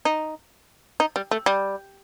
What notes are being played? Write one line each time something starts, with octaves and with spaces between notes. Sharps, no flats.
D#4
D#4
G3
A3
G3